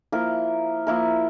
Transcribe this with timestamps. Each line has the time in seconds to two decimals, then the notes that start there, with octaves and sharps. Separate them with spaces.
0.12 F3 A#3 E4 A#4
0.87 F3 A#3 E4 A#4